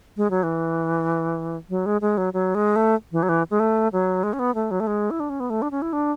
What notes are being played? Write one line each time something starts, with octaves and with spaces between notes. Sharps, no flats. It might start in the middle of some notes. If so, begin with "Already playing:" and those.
G#3
F#3
E3
F#3
G#3
G#3
F#3
F#3
G#3
A3
E3
F#3
E3
G#3
A3
F#3
G#3
C#4
B3
A3
F#3
A3
G#3
E4
D4
C#4
B3
A3
D4
C#4
E4
D4